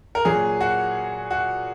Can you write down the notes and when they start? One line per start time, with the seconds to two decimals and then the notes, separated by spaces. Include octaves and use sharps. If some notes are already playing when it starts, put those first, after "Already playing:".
0.15 A#4
0.25 A#2 F#3 G#4
0.61 F#4
1.31 F#4